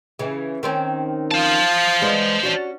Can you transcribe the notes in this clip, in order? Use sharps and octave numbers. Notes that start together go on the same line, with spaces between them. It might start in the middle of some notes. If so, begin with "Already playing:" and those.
C#3 E3
D#3 C4 C#4
F4 C5 A5
G#3 B3 D4
C#4 D4 F#4